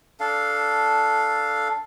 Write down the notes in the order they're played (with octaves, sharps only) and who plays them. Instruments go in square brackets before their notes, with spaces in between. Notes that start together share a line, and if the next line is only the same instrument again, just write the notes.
[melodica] D4 A4 F5